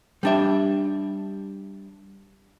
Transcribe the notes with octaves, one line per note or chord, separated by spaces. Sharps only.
G3 D4 E5